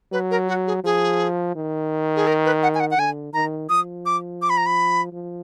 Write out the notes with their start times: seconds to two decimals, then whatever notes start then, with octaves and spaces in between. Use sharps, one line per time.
0.12 F#3 B4
0.31 A#4
0.48 F#4
0.67 G#4
0.84 F3 G#4
1.55 D#3
2.16 G#4
2.27 A#4
2.45 B4
2.63 F#5
2.74 G#5
2.80 F#5
2.91 F#5
2.98 D3 G#5
3.33 D#3 A#5
3.69 F3 D#6
4.06 D6
4.42 D6
4.49 B5
4.57 A#5
4.66 B5
5.13 F3